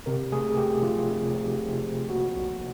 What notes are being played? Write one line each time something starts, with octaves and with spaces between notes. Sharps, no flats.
C3 A#4
A3 G#4
A3 G4
F3 F4
C3
F3
C3
F3
A#3 F#4
B1